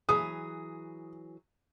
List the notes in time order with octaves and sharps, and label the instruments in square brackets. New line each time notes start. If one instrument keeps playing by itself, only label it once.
[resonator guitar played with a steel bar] E3 F#3 G#4 [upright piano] D#6